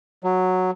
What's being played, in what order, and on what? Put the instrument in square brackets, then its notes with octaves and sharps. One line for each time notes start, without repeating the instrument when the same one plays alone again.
[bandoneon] F#3